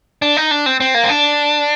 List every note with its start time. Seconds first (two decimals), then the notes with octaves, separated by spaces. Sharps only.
0.22 D4
0.37 D#4
0.51 D4
0.66 C4
0.80 C4
0.94 A#3
1.04 C4
1.09 D4